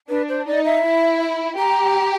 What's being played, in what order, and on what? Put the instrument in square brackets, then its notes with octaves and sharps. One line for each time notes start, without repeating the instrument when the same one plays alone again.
[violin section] D4 [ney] B4
[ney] C5
[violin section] D#4 [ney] D5
[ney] E5
[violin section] E4
[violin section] G4 [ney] A#5